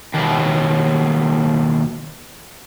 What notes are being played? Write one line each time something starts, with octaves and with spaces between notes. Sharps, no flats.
D#2 B2